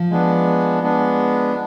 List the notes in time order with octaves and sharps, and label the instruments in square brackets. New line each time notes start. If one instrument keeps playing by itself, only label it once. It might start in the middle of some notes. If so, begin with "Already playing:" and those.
Already playing: [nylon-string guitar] F3
[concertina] G#3 B3 D4
G#3 B3 D4